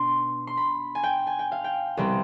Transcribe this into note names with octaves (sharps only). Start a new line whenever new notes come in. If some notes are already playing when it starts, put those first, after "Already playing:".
Already playing: B2 D4 C6
C6
B5
G#5
G5
G#5
G5
F5
G5
C2 B2 G3 C4